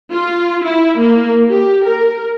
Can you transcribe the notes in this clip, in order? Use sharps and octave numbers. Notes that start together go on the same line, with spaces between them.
F4
E4
A#3
G4
A#4